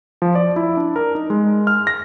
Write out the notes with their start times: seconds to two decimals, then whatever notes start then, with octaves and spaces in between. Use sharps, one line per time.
0.22 F3
0.35 D5
0.56 E4
0.77 D4
0.96 A#4
1.15 D#4
1.30 G#3
1.67 F6
1.87 A#6